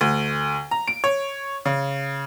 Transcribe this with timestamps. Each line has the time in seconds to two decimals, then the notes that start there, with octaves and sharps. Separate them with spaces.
0.01 D2
0.71 A#5
0.88 D7
1.04 C#5
1.65 C#3